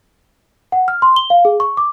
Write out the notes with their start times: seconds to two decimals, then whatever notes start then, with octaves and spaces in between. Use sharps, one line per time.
0.72 F#5
0.88 F6
1.02 C6
1.16 G7
1.30 F5
1.45 G#4
1.60 C#6
1.77 D6